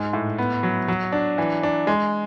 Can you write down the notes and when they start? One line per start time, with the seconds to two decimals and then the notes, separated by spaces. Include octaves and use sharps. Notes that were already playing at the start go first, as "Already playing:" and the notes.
Already playing: G#2 G#3
0.13 A2
0.38 B3
0.63 F#3
0.88 F#3
1.12 D4
1.38 E3
1.63 D4
1.87 G#3